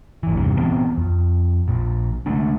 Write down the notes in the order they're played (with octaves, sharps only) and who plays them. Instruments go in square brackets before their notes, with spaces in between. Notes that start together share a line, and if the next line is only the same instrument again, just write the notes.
[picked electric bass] G#1 E3
E2 G2 C3
A#2 E3 B3 C4
F2
A#1 A#2
D3 G#3 A3 D4